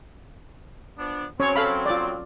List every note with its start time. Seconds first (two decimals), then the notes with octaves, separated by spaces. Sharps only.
0.98 F3 B3 D4
1.40 F#3 C4 C#4 C#5
1.56 A4 F5 B5
1.86 F4 D5